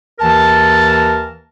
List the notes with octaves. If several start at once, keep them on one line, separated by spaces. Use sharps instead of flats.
D#2 E3 A#4 A5